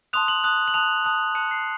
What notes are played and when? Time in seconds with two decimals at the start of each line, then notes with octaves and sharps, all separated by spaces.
0.13 A5 C6 D#6 F#6 F7
0.28 F#7
0.44 A5 D#6 F#6
0.68 F#7
0.74 A5 D#6 F#6 F7
1.04 A5 D#6 F#6
1.35 A5 D#6 F#6 C#7
1.51 C7